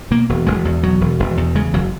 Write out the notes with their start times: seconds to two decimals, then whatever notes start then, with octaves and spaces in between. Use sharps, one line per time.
0.11 B2 A#3
0.29 E1
0.47 E1 G#3
0.65 E2
0.83 B2 F#3
1.01 E1
1.20 E1
1.37 E2
1.55 C#3 G#3
1.74 F#1 F#3